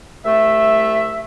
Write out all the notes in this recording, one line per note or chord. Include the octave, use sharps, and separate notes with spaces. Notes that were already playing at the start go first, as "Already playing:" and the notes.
C2 A3 E5